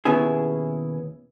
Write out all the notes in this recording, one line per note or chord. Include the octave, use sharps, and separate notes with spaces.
D#2 B2 B3 C#4 E4 G#4